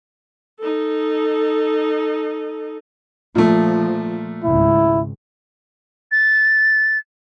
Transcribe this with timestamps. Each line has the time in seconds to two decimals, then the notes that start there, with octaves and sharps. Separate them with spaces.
0.60 D#4 A4
3.35 A#2 F3 A3
4.44 G#1 C#2 E4
6.12 A6